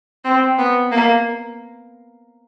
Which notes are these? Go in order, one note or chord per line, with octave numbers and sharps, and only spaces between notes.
C4
B3
A#3